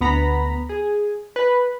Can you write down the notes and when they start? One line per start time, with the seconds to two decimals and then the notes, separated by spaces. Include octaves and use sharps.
0.01 D2 B3 A#5 B5
0.69 G#4
1.36 B4